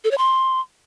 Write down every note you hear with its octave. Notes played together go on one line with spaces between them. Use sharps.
A4
C#5
C6